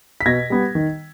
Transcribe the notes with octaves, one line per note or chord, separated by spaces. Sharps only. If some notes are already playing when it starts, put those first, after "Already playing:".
B6
B2 G#6 A#6
G3 B3
D#3